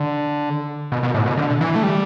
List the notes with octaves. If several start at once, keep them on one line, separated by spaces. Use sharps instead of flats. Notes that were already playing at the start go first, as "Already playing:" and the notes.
Already playing: D3
B2
B2
A2
B2
D3
E3
A3
G3